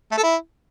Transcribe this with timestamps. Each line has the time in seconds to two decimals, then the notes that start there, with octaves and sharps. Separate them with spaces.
0.12 A3
0.17 A4
0.23 E4